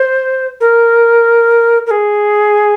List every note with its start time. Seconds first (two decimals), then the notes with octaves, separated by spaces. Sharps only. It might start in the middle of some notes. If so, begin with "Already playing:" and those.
Already playing: C5
0.60 A#4
1.86 A#4
1.91 G#4